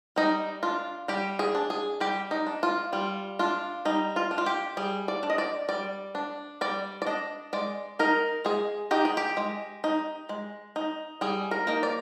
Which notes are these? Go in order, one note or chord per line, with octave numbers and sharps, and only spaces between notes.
G3 D#4
D4 F4
G3 G4
G#4
D4
G#4
G3 G4
D#4
D4
F4
G3 F4
D4 F4
G3 D#4
F4
D4
F4
G4
G3 G#4
D5
D4
D#5
D5
G3 D5
D4
G3 D5
D5
D4 D#5
G#3 D5
D#4 A#4
G#3 G#4
D#4 G4
G#4
G4
G#3
D#4
G#3
D#4
G3 G#4
A#4
A#3 D#4
D5